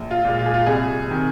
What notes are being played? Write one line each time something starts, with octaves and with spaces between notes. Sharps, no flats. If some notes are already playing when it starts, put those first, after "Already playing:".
Already playing: A#1
F4
A#2 G#3
F4
G#4
F4
C2 G#4
C3 D#3